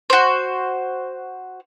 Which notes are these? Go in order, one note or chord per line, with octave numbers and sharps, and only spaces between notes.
F#4 C5